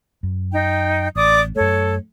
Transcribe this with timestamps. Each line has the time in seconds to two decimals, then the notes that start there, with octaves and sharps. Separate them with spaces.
0.23 F#2
0.52 D#4 G5
1.16 A1 D5 D6 D#6
1.56 F#2 A3 A4 C#5